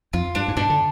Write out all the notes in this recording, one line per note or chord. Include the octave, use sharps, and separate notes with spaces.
F2 F4
G2 D4
G#2
G2 B2 D4
D3